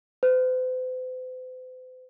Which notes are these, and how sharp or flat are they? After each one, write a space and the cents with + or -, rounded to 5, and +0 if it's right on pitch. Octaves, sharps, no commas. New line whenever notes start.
C5 -45